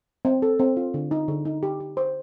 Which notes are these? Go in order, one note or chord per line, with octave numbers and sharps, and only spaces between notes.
C4
A4
C4
F4
D3
D#4
D3
D#4
G4
G4
C5